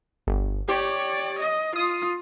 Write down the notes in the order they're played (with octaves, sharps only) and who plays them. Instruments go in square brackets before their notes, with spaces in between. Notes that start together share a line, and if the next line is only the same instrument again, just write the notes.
[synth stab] G1
[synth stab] G4 [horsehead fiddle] C#5 D5
[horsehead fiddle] D#5
[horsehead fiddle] F4 [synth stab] D#6